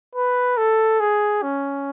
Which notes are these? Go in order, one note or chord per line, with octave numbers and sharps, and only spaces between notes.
B4
A4
G#4
C#4